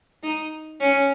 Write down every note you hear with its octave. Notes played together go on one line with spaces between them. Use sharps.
D#4
C#4